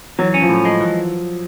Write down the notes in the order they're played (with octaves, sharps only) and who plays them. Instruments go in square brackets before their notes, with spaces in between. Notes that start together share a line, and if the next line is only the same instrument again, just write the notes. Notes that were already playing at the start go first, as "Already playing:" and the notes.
[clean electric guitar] E3 [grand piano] F#3
[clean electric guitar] C#4
[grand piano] F3
[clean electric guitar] A2
G#3
E3